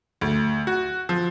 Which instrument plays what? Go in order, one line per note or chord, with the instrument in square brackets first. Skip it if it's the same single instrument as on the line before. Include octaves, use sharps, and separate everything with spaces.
[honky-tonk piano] D2
F#4
F3